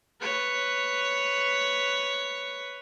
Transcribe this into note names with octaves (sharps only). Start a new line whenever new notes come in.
B4 C#5